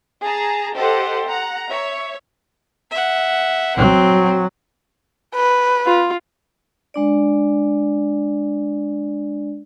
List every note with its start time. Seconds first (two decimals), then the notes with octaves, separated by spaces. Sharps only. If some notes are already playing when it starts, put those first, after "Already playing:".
0.24 G#4 A5 A#5
0.75 G4 A4 C5 D#5 F#5
1.28 F#5 A#5
1.69 C#5 E5
2.91 E5 F#5
3.77 F#3 C4
5.35 B4
5.86 F4
6.94 G#3 D4 D5